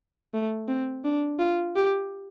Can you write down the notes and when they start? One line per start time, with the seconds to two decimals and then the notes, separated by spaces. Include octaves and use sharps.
0.34 A3
0.68 C4
1.04 D4
1.39 F4
1.76 G4